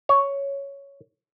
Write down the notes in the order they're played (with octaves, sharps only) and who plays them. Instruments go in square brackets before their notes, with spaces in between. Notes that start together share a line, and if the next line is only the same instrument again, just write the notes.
[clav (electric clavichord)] C#5